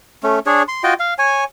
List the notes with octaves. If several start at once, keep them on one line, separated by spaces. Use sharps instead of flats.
A3 C#4
D4 G#4 C#5
C6
F4 F#4 D#5 G5
F5
C#5 G#5